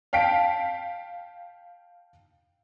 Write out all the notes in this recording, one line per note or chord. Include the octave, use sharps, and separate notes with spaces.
F5 G5 A5 B6 D7